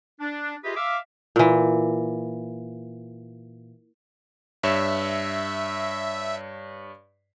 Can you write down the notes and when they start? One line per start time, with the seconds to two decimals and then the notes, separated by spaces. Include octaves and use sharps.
0.20 D4
0.64 F4 G4 G#4 B4 D#5 E5
0.76 E5 F5 D6
1.36 A#2 E3
4.63 G2 C#5 E5 E7